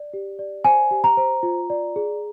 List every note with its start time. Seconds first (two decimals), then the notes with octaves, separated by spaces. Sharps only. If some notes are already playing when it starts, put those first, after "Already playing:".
Already playing: D5
0.14 G4
0.39 D5
0.64 C5 G#5
0.91 G4
1.04 A#5
1.17 C5
1.43 F4
1.70 D5
1.96 G#4